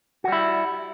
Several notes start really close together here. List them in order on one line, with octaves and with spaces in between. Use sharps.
F#4 G3 E4